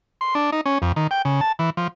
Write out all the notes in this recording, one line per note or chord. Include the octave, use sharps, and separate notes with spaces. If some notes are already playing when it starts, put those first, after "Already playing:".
C6
D4
D#4
C#4
F2
D#3
G5
C#3
A5
E3
F3